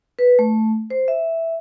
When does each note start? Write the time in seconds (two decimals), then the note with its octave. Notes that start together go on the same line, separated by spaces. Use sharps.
0.19 B4
0.39 A3
0.90 C5
1.08 E5